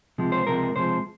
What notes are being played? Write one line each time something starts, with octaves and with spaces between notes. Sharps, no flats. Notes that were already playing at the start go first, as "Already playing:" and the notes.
C#2 C3 F3 G#3
C5
C#2 C3 F3 G#3 A#4
C#2 C3 F3 G#3 C5